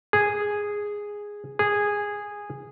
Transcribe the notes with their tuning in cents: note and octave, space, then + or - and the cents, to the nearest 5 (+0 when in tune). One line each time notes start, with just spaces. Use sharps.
G#4 -5
G#4 -10